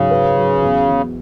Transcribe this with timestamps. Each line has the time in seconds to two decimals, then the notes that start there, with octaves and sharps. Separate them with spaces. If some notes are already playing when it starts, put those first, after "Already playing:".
Already playing: G#2 C#3 F#3
0.11 B4
0.36 F#3
0.62 E2
0.88 E2